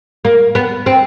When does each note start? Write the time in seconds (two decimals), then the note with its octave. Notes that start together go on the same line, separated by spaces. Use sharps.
0.25 A#3
0.55 B3
0.86 C4